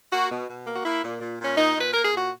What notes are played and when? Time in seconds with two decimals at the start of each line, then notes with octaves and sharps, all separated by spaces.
0.12 A#3 F#4
0.30 B2
0.49 B2
0.67 A#3
0.75 F#4
0.85 A#3 E4
1.03 A#2
1.21 A#2
1.39 A#2
1.45 C#4
1.57 A#2 D#4
1.75 A#2
1.80 B4
1.93 A#3 A#4
2.05 G#4
2.11 A#2
2.17 F#4